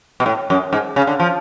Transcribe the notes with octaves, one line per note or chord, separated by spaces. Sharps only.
B2
A2
F#2
G#2
C#3
D3
F3